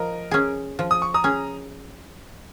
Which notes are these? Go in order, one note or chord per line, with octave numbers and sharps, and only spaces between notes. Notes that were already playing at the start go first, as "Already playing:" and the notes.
Already playing: F3 A#4 D#5
C#4 G#4
F3
D#6
C#6
A#5 D#6
C#4 G#4